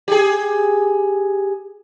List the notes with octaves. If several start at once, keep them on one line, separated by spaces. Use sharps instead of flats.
G4 G#4